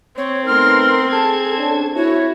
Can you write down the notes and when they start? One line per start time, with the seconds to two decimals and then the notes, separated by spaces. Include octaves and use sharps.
0.17 C4 C#5
0.46 A3 B3 D#4 A#4 C6 F6
1.12 G#4 A4 A5 G#6
1.57 C#4 D4
1.95 E4 F#4 C#5